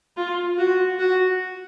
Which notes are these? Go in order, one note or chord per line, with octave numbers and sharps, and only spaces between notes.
F4
F#4
F#4